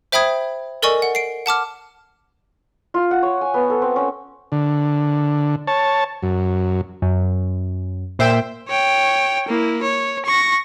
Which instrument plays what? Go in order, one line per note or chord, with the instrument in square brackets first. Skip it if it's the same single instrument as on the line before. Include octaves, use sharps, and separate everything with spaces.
[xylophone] C5 E5 G5 B5 D#6 G#6
A4 A#4 D5 D#5 G#5 C#6
F#5
C7 D7
F#5 A5 D6 F6
[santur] F4
F#5
C#5
G#5
B3
A4
C4
C#4
[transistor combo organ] D3
C#5 A5
F#2
[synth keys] F#2
A#2 C5 E5 G5 E6
[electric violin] C#5 G5
A#3 E4
C#5
C#6 A#6